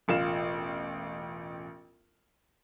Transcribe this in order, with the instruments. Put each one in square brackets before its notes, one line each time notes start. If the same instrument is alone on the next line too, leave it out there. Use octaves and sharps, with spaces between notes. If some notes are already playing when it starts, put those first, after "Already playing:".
[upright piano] E1 A1 F4 E7